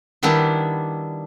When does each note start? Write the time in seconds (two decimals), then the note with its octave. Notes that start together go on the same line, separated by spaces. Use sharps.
0.23 D#3 G3 B3 D4 E4